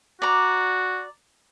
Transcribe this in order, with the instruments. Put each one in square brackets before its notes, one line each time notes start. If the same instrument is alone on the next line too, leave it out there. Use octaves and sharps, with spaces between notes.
[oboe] F#4 [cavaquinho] D5 A#5